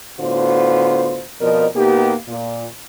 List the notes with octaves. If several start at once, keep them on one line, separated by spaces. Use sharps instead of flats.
A2 D3 B3 F4 F#4 C5
F2 B2 F3 A#4 D5 D#5
B2 A#3 B3 D#4 G4
A#2